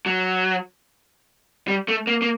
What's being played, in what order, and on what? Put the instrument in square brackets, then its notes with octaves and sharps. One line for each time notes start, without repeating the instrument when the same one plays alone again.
[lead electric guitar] F#3
G3
A3
A#3
A#3